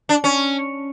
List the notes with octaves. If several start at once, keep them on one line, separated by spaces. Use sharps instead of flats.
D4
C#4